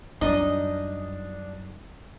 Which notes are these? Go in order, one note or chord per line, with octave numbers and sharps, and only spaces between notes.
F#2 G3 D4 D#4 D#5